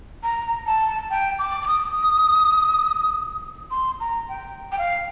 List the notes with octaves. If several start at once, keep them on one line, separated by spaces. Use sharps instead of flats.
A#5
A5
G5
D6
D6
D#6
C6
A#5
G5
G5
F5